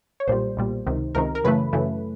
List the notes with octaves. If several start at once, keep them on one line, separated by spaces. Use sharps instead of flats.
C#5
B1 A#2 G3 C5
B1 A#2 G3
C#2 C3 D#3
C#2 C3 D#3 A#4
A#4
F#2 C#3 E3 A3 B4
F#2 C#3 E3 A3